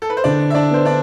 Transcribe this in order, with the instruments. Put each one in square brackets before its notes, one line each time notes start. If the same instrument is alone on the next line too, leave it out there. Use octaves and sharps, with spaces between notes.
[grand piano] A4
B4
C5
[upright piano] D3 [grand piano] D4 D5
[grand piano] E5
D4 D5
[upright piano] B3 [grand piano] C5
[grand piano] D4 D5